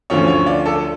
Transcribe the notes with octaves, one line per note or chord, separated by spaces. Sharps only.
D2 D3 F3 C#4 C#5
C#5
D5
A4